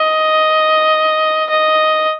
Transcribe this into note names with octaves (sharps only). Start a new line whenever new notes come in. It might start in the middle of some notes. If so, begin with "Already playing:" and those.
Already playing: D#5
D#5